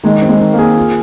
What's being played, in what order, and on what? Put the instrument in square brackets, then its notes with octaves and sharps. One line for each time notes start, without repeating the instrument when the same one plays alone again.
[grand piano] D#3 [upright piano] G#3
[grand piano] C4
[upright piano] G#3
[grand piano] D#3
[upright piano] A#3
[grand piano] G#4
F4